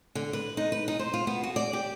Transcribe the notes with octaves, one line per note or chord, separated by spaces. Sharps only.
D3
B4
D#4
B4
D#4
C5
F4
B3
F#4
D5
G4